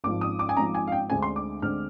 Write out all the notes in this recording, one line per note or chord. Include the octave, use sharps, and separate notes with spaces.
G#1 G#2 F3 D6
D#6
D6
G#5
G#1 G#2 F3 A#5
G#5
F5
G5
D2 D3 G#3 C4 G#5
C6
D6
D2 D3 G#3 C4 F6